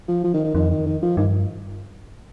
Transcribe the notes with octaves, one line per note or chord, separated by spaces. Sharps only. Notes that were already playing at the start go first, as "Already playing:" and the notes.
F3
F3
D#3
D#3
F2 D#3
D#3
D#3
F3
G2 D#3